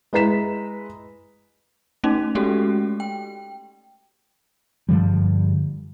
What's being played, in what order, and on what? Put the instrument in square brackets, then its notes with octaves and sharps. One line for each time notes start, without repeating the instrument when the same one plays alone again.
[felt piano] G#3 E4 B4 A#5 B6 E7
[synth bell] A3 C#4 D#4
G#3 A3 C#4 F#4 G4 A4
G5
[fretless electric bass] G2 D3 F3 G3